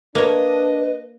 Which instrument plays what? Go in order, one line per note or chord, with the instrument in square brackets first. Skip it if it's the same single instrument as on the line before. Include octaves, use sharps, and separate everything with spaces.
[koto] A#3 C#5 [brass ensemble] D4 [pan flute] B4 [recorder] D#5